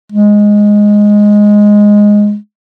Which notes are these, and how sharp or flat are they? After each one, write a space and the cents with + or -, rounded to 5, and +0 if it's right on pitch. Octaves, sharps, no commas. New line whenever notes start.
G#3 -5